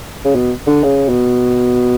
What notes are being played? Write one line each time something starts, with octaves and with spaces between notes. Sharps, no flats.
C#3
B2
D3
C#3
B2